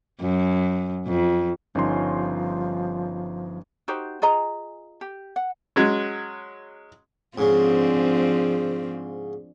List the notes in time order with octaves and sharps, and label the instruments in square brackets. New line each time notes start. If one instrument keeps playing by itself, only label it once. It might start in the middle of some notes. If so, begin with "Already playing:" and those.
[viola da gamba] F#2
F2
[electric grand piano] G1 D#4 C6 [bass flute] F3 [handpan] G3 C#4
[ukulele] D#4 F#4 G4 C5
F4 G#4 D#5 A#5
G4
F#5
[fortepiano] F#3 G#3 C#4
[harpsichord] G#2 C#3 [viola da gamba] F3 C4 D4